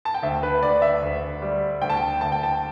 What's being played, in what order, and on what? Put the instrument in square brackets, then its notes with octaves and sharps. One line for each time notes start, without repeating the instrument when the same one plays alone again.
[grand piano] A5
G5
D2 E5
B4
D2 D5
E5
D2
G3
D2 G5
A5
G5
D2 A5
G5
A5